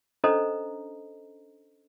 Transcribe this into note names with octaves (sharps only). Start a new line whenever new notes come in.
C#4 D4 A4 C5 D#5 A#5